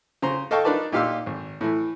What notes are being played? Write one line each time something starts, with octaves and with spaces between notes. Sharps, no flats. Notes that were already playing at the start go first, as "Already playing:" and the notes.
C#3 C5 A#5 C6
A4 D#5 F5 G5 A5 C#6
D4 D#4 A#4 B4 D5 A5
A#2 D#4 G4 F5 C6 E6
G#1
A2 E3